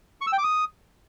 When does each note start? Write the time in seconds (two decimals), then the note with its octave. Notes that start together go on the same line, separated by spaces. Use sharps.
0.21 C#6
0.27 E6
0.32 G5
0.38 D6
0.44 D#6